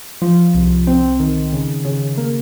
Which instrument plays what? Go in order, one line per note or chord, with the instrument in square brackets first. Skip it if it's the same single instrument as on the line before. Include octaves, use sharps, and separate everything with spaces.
[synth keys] F3
C2
C4
D#3
C#3
C#3
A#3